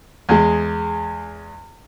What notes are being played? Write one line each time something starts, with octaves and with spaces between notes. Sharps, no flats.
E2 G#3